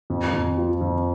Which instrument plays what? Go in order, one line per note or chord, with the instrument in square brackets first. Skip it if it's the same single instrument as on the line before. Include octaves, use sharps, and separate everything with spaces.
[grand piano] F2
F2
F3
F2